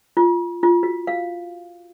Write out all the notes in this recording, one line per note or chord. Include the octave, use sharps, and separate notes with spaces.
F4
F4
F#4
F5